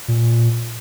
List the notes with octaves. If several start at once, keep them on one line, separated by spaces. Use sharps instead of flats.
A#2